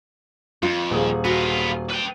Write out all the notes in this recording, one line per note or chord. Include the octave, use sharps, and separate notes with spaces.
F2 F4
D#1 G#4
B3 F4 F#4
B4 G5